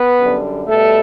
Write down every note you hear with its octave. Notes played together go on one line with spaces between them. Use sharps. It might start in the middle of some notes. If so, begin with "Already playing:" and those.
Already playing: B3 B4
F#2 D3 G3
B2 G3 A3 A4